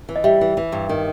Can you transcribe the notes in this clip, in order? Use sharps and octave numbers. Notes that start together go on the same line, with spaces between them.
E3
D#5
G3 E5
E3
E3
G2
D#3